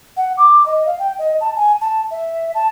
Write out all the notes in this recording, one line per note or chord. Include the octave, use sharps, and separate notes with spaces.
F#5
D6
D#5
F5
G5
D#5
A5
G#5
A5
E5
A5